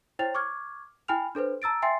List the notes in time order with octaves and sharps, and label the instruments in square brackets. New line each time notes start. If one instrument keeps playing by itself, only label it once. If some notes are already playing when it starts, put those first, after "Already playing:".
[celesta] E4 C5 C#5 G5 A6 F7
C#6 D6 F6 G#6
E4 G5 G#5 B5 F6 F7
D4 A4 B4 C5
A5 A#5 E6 A6 D7
E5 G5 G#5 C6 A6 C7